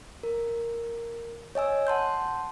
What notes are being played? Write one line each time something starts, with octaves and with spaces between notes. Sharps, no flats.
A#4
C#5 D#5 G#5 E6
F#5 A5 C6 G6